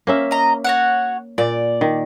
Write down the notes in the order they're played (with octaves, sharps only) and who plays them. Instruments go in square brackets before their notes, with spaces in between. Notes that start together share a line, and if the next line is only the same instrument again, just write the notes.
[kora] A#3 C#4 E5
[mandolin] D#5 A#5
F#4 C#5 F#5
[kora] A#2 [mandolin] D5
[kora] D#3